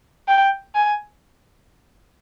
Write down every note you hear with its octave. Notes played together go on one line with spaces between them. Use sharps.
G5
G#5